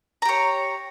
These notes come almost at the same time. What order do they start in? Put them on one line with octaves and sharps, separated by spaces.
A#5 G4 C#5